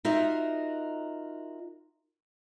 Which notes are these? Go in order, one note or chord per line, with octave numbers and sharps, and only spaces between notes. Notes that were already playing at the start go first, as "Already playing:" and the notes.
D#4 F4 F#4 A#4 D#5 E5